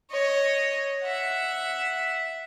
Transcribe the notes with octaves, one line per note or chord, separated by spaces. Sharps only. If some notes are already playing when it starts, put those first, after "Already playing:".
C#5 D#5
E5 F#5